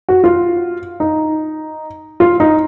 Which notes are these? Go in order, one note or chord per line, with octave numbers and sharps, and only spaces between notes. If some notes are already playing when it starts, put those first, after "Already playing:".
F#4
F4
D#4
F4
D#4